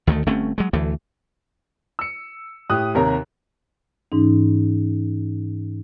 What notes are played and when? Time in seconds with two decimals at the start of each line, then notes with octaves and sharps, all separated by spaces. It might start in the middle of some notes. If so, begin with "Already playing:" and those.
0.07 D2 D#3 F3 A3
0.27 G1 A3 C4 C#4
0.58 F#3 G#3
0.73 D2 E3 A3
1.99 E6 C#7
2.70 A2 G4 D#6 F#6
2.95 D#2 C3 A#4 C#5 A#5
4.12 G#2 E3 C#4 D#4